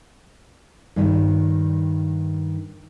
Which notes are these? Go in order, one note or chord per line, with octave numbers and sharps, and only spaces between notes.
G2 D#3